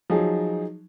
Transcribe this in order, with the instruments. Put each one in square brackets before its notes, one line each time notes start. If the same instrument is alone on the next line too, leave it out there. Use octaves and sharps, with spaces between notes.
[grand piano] F3 F#3 [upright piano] D#4 G#4